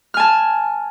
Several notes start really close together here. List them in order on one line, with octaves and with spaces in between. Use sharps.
F6 G#5 A5